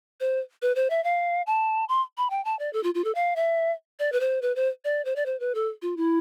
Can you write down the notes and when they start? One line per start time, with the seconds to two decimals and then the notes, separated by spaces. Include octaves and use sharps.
0.20 C5
0.62 B4
0.75 C5
0.90 E5
1.04 F5
1.47 A5
1.89 C6
2.17 B5
2.30 G5
2.45 A5
2.59 D5
2.73 A4
2.83 F4
2.95 F4
3.04 A4
3.15 F5
3.36 E5
3.99 D5
4.12 B4
4.20 C5
4.42 B4
4.56 C5
4.85 D5
5.05 C5
5.16 D5
5.26 C5
5.40 B4
5.55 A4
5.82 F4
5.97 E4